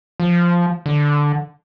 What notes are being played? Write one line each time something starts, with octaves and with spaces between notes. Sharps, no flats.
F3
D3